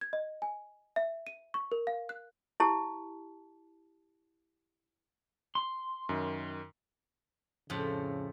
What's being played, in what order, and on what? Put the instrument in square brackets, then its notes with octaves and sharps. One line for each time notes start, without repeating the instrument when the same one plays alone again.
[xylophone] G#6
D#5
G#5
E5
D#7
C#6
A#4
F5
F#6
[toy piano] E4 G4 A5
[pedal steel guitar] C6
[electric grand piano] F#2 D#3
[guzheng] F2 A2 A3 [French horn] C#3